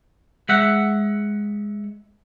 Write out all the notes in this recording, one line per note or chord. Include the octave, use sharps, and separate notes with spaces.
G#3 E5 F#5